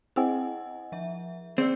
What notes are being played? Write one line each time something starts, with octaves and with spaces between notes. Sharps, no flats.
C4 E4 G#4 D#5 F#5 G#5 E6 F6
F3 E5
C4 G#4 D5 E6